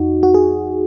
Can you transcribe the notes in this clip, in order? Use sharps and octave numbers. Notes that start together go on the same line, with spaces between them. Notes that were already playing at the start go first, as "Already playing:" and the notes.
Already playing: F2 D#4 F#4
F#4
G#4